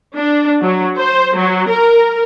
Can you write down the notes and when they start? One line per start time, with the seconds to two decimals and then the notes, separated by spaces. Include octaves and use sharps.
0.15 D4
0.61 F#3
0.97 C5
1.36 F#3
1.69 A#4